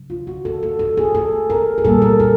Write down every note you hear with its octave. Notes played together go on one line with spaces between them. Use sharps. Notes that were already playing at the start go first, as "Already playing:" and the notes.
Already playing: C#3 F#3
F4
F#4
A4
A4
A4
G#4
A4
A#4
G#4
A#2 G3 A#3 A4
A#4
A4